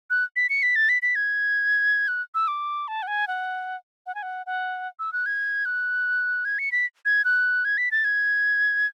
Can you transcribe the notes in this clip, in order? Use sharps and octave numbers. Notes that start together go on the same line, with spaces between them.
F#6
B6
C#7
B6
A6
B6
B6
G#6
F#6
E6
D6
A5
F#5
G#5
F#5
F#5
G#5
F#5
F#5
E6
F#6
G#6
F#6
G#6
C#7
B6
G#6
F#6
G#6
B6
A6
G#6